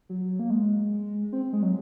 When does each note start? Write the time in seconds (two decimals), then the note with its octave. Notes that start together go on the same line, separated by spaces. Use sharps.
0.09 F#3
0.39 A#3
0.50 G#3
1.32 C4
1.53 G#3
1.63 F#3